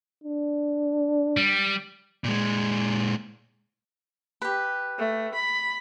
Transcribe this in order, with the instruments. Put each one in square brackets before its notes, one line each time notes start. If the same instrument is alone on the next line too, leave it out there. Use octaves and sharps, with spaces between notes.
[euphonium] D4
[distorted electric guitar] G3
[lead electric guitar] A#2 G#3
[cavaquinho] G4 B4
[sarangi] A3
B5